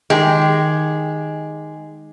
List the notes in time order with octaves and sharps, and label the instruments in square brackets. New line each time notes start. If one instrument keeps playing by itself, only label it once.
[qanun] D#3 G4 [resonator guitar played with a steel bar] G#3